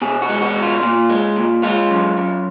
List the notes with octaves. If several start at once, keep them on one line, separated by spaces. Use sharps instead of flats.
B2 G#4
F#4
G#3
F#4
B2
F4
A#2
G#3
A#2
G#3 F4
F#2
F#2